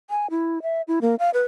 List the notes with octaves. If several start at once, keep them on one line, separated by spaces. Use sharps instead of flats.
G#5
E4
E5
E4
A#3
F5
B4